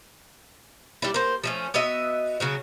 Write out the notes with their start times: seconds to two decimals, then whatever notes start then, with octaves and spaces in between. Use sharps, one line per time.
1.02 G3 D4 E4
1.14 A#3 C5
1.44 F3 A3 C#4
1.74 B3 F#4 D#5 E5
2.40 C#3 F#3 F#4